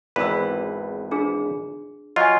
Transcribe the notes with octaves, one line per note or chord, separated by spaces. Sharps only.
G#1 E2 B4 B5 E6
D4 F4 G#4
F#3 F4 D#5 G#5